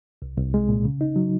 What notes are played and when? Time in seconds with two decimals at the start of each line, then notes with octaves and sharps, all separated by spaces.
0.22 C2
0.38 C2
0.54 G#3
0.69 A#2
0.85 C#3
1.01 D#4
1.16 F#3